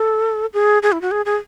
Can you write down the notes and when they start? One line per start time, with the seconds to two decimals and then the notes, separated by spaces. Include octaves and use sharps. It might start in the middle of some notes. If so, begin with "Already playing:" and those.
Already playing: A4
0.54 G#4
0.83 G#4
0.92 E4
1.01 F#4
1.11 G#4
1.26 G#4